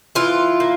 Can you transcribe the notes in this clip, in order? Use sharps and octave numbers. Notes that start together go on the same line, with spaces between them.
E3 F4
A#3